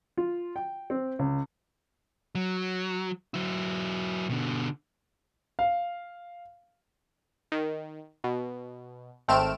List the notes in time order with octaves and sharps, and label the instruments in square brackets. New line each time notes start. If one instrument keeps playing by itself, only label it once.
[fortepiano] F4
G5
C4
C#2
[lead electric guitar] F#3
F#3 E4
B2 D3
[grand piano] F5
[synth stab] D#3
B2
G#1 A3 C4 F6 D7 E7